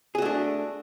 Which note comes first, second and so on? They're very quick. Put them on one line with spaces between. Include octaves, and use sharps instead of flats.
G#4 F#4 A3 D4